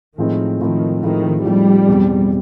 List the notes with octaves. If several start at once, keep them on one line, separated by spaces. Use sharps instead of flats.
A2 D#3 F3 G#3 C4 D#4
A2 D#3 F3 G#3 C4 D#4
A2 D#3 F3 G#3 C4 D#4
A2 F3 G3 G#3 C4 D#4
E2 B2 G#3 C4